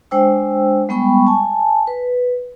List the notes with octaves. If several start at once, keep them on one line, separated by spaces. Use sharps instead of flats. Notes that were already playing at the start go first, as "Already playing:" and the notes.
G#3 D4 C5 G5 E6
G3 G#3 B3 G5 B5 C#6
G#5 A5
B4